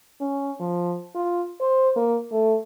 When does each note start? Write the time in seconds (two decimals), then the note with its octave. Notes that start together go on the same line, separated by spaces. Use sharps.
0.21 C#4
0.60 F3
1.15 F4
1.61 C5
1.96 A#3
2.32 A3